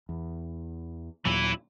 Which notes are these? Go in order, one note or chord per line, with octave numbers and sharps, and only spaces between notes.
E2
D#2 A#2 E3 F#3 E4